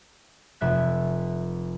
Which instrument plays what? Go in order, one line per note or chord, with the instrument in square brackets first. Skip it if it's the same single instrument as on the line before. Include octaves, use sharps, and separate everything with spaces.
[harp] F1 E5 F#6